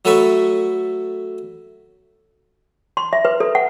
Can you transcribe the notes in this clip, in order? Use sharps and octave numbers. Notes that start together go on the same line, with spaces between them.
F#3 A3 A4 B4 C#6
C6
E5
B4
A4
F#5